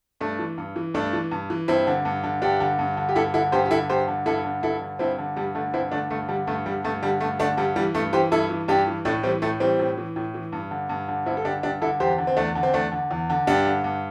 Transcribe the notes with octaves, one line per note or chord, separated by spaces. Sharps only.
G2 A3 D4
E3
G2
E3
G2 A3 D4
E3
G2
E3
G2 C4 E4
D3
G2
D3
G2 D4 G4
D3
G2
D3
G4
G2 E4 A4
D3 E4 A4
G2 G4 C5
G4
D3 E4 A4
G2 G4 C5
D3
G2 E4 A4
D3
G2 E4 A4
D3
G2 C4 E4
D3
G2 G3
D3 A3
G2 C4 E4
D3 A3 D4
G2 A3
D3 G3
G2 A3
D3 G3
G2 A3
D3 G3
G2 A3
D3 A3 D4
G2 G3
E3 G3
G2 A3
E3 G4 C5
G2 E4 A4
E3
G2 D4 G4
E3
A2 A3 D4
E3 G3 C4
A2 A3
E3 G3 C4
A2
E3
A2
E3
G2
D3
G2
D3
G2 C4 E4
A4
D3 D4 G4
G2 D4 G4
D3 E4 A4
E2 G4 C5
D3
C4
E2 A3 D4
D3
C4
E2 A3 D4
D3
E2
D3
G2 D4 G4
D3
G2